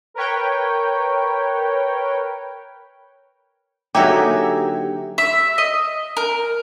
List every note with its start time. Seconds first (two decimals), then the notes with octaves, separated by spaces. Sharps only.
0.14 A#4 B4 C#5 G5
3.95 D3 F#3 A#3 D#4 G4 E5 G#5
5.18 E5
5.58 D#5
6.17 A#4